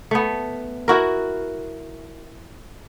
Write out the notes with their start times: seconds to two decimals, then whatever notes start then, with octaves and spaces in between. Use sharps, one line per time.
0.11 A3 B3
0.88 E4 F#4 A#4